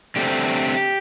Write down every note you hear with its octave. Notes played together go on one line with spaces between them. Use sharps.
D3 A3 C4 G4